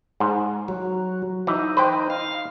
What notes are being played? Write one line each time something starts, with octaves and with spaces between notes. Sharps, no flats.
G#2
F#3
E3 D#4
B4 C5 G5
F5